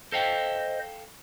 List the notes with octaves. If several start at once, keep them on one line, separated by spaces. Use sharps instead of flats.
A4 C5 D#5 F5 G5